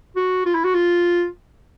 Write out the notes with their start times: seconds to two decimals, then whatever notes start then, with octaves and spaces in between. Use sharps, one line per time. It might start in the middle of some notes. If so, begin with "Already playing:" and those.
0.16 F#4
0.46 F4
0.55 E4
0.64 F#4
0.74 F4